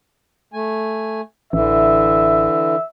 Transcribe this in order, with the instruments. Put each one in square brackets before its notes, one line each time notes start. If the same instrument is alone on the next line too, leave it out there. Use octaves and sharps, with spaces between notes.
[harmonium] A3 G#5
[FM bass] A1 [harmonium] D3 E3 [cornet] E5